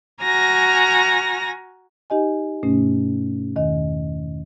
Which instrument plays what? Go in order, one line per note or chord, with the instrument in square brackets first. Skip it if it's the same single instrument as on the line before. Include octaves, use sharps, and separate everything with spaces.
[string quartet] F#4 G#5 A#5 F6 A#6
[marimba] D#4 G4 D#5 G#5
G2 B2 A3 C#4
E2 D#3 D#5